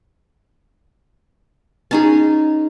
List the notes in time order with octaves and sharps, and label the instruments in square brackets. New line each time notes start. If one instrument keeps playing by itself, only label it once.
[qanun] C#4 D#4 G#4